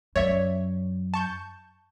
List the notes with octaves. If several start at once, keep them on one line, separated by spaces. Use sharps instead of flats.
F#2 C#5 D5 E5
A5 C#6 G6